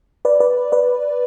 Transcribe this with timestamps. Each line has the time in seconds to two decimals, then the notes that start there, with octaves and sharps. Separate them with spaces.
0.25 B4 D5
0.40 B4 D5
0.72 B4 D5